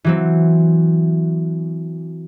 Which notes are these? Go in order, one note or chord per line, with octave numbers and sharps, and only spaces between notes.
E3 F#3 C4